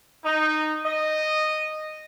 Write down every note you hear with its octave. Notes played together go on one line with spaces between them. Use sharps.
D#4
D#5